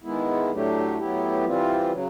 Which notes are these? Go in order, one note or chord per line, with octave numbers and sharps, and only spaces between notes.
D#3 G#3 B3 E4
A2 F#3 A3 D4 G4
A2 F#3 B3 E4 G4
E3 G3 C4 F4
C#3 F#3